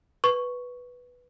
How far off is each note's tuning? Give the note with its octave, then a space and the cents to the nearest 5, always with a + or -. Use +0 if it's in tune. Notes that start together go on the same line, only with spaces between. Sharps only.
B4 +0 C#6 +5